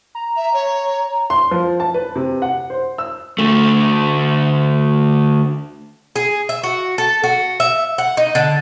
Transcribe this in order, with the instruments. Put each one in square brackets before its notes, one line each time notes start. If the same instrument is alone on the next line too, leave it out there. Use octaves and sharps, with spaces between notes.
[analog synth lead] A#5
[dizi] E5
C#5
[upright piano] C6
F3
A5
B4
C3
F#5
C5
E6
[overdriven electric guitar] D2 A3
[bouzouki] G#4
E5
F#4
A4
F#4
E5
F#5
D#4
D3